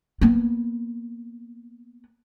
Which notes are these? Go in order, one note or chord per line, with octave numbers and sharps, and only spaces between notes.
A#3 B3